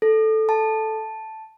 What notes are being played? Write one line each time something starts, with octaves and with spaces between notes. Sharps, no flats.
A4
A5